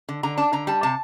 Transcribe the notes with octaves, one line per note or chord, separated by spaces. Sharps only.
D3
D3 A#5
D4 A5
D3 A#5
G3 A5
C3 A5